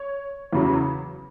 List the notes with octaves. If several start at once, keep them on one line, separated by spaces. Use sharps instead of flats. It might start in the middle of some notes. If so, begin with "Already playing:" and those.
Already playing: C#5
E2 C#3 F#3